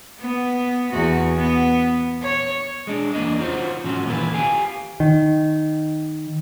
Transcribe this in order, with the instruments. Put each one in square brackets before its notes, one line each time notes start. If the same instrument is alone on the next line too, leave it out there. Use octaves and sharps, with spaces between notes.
[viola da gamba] B3
E2 F#4
B3
C#5
[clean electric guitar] G#3 D4
E2 A#3 D4 D#5
D#4 F4 F#4 C5 C#5
G#2 F3 C#4 F#4
D2 A#2 D#3 E3 A4 B4
G4 F5 G5 G#5
[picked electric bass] D#3